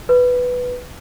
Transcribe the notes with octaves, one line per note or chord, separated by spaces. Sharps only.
B4